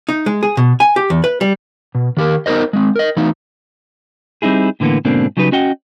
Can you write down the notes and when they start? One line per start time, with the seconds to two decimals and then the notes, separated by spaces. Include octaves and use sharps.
0.09 D#4
0.26 G#3
0.43 G#4
0.57 B2
0.80 G#5
0.96 G4
1.10 E2
1.24 B4
1.41 G3
1.95 B2
2.17 D#3 G4 A#4
2.46 B3 D#4 A#4 C5 D#5
2.73 G#3 C4
2.96 A#4 D#5
3.17 E3 A3 D#4
4.42 G3 C4 D#4 E4 G#4
4.80 A2 D3 E3 A#3 B3
5.05 G#2 B2 D3 A#3 C4 D4
5.37 C#3 F#3 G3 D#4 B4
5.52 C#4 F#4 D#5 F#5 G5